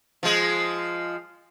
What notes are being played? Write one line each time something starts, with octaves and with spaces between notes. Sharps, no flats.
F3 G#3